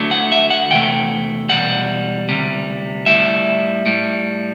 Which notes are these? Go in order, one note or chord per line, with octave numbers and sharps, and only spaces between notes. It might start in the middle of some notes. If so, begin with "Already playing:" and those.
Already playing: D2 D3 F#3 A3
F#5
E5
F#5
E2 C3 A3 G5
E2 B2 G3 F#5
D2 C3 G3
A2 G3 E5
A2 G3